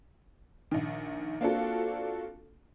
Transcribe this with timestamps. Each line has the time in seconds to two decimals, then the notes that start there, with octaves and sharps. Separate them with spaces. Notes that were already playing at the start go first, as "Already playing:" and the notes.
0.71 A#1 D#3
1.41 A#3 C4 D4 F4 F#4 A4